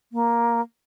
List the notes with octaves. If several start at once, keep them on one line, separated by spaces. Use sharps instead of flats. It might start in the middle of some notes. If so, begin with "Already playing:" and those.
A#3